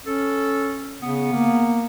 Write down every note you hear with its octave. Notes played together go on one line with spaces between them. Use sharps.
C#4 A4
C#3 B3
A#3